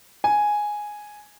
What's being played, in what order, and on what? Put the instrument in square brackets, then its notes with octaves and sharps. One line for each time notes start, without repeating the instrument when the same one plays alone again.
[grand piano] G#5